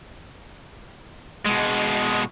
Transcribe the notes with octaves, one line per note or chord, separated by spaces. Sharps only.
B2 G#3